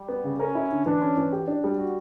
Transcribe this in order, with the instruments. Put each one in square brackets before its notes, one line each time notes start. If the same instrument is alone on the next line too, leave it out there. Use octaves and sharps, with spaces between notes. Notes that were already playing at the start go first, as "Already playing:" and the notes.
Already playing: [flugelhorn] G3
[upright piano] B3
C#3
[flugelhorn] C#4 [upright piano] A#4
[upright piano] E4
D3
[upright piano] E3 [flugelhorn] D4
[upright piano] C#4
E3
G4
D4
G3
F#4